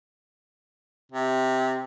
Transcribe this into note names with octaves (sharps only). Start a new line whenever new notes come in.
C3